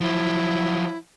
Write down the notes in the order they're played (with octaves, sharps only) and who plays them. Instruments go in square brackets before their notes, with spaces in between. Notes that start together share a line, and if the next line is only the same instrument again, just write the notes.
[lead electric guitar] F3 F#3 [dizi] E4